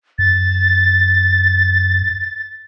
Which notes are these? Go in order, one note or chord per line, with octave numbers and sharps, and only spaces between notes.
F#2 A6